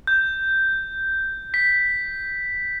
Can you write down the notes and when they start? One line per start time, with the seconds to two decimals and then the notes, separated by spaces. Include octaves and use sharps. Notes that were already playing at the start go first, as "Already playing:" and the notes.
0.07 G6
1.54 B6